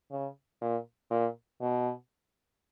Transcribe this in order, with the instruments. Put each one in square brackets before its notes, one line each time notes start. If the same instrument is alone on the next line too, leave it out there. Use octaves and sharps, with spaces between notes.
[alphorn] C#3
A#2
A#2
B2